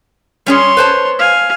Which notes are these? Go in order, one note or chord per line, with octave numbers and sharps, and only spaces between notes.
G3 C#4 G#4 C#5 C6
B4 C5 A5
F5 G#5